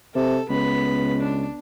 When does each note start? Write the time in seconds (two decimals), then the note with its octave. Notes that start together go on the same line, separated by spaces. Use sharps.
0.15 C3 A4
0.49 C#2 B3 B5
1.21 D4